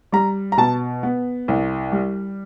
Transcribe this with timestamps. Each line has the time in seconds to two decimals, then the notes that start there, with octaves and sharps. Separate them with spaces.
0.12 G3 A#5
0.52 A#5
0.57 B2 A5
1.03 B3
1.48 C2
1.92 G3